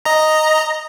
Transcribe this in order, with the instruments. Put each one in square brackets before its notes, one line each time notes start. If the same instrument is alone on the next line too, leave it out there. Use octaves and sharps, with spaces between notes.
[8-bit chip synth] D#5 A#5